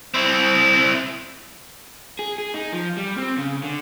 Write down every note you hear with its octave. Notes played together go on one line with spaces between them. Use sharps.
C4 E4
G#4
G#4
D#4
F3
G3
C4
C#3
D3